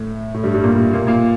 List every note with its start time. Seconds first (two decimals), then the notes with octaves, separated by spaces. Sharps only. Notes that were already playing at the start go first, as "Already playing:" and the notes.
Already playing: A2
0.34 A2
0.43 G2 G3
0.54 G2 G3
0.64 A#2 A#3
0.93 A#2 A#3
1.07 A#2 A#3